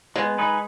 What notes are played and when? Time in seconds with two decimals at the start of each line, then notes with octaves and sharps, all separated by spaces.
0.16 G#3 B3
0.38 D#4 G#4 B4